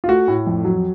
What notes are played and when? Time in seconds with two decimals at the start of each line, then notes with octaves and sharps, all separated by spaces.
0.04 F4
0.08 A3 F#4
0.28 A2
0.47 F2
0.65 F#3